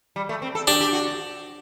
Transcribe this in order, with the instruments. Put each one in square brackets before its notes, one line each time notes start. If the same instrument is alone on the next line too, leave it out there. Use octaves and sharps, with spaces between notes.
[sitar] G3
A3
C4
A4
[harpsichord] D4 [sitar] G4
[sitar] G4
F#4